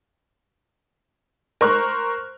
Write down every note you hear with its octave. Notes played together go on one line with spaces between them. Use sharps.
A#4 C5 C#6 F6 F#6